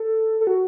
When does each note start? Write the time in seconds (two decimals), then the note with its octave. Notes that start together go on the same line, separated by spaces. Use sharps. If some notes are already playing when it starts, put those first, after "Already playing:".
Already playing: A4
0.41 A4
0.47 F#4